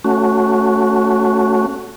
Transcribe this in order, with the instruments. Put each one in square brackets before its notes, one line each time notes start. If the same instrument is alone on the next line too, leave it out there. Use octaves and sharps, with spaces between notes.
[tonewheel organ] A3 C#4 F#4